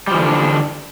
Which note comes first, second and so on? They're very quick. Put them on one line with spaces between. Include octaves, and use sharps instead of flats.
G3 F3 E3 D3 D4